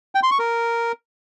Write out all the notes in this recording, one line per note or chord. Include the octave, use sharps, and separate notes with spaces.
G5
C6
C#6
A#4